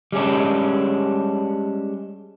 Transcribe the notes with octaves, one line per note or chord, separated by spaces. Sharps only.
G3 G#3 C#4 D4